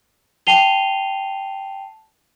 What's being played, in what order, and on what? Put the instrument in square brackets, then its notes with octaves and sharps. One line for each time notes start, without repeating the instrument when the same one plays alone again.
[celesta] G5 A5 C7 D#7 F7 G7